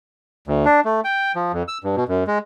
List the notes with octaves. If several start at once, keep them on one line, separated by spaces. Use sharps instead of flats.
D2
D4
A3
G5
F3
F2
E6
G2
B2
F#2
G#3